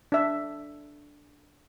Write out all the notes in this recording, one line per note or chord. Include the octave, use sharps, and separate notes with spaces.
D4 E5